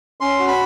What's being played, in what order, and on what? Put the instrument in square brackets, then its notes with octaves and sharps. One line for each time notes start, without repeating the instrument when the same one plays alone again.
[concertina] C#4 C6
F#4
B5